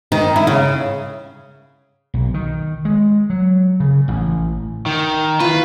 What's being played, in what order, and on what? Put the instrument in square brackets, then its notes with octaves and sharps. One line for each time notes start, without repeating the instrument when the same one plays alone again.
[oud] D#3
E4
C#3
[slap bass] B1
D#3
G#3
F#3
C#3
A1
[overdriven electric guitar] D#3
[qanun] E4 F4 [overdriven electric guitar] B4